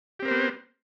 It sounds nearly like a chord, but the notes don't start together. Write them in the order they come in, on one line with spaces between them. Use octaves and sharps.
G4 C4 A#4 C5 B3